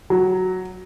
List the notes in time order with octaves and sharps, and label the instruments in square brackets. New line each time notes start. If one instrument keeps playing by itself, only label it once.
[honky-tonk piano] F#3